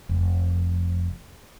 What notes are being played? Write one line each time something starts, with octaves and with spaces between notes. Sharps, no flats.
F1